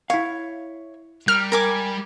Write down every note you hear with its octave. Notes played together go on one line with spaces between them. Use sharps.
E4 C#5 F5
G3 A#4 F6
A#4 G#5 D6